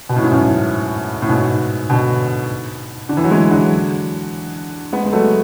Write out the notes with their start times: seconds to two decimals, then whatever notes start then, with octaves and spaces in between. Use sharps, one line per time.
0.09 B2
0.16 A2
0.24 G#2
0.31 F#2 A2
1.22 A2
1.29 G#2 B2
1.90 B2 D3
3.09 D3
3.17 E3
3.24 F#3
3.31 E3 G#3
3.51 D3 F#3
4.93 G#3 B3
5.05 G#3
5.12 F#3 A3